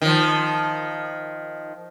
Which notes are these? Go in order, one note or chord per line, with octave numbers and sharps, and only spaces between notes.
D#3 F3